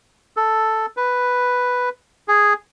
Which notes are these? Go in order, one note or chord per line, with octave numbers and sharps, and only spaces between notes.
A4
B4
G#4